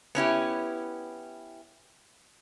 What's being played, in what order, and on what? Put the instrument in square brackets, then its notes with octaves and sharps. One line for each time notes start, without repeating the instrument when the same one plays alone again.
[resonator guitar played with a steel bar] B3 C#4 E4 G4